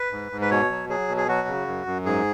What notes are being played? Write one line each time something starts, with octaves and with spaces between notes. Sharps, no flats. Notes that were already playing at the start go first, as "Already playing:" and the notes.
Already playing: B4
G#2
G#2
B4
B2 C#5
F#3
F#3 G#4
B2
G#4
F#3 F#4
C#3
F#2
F#2
G#2 G#4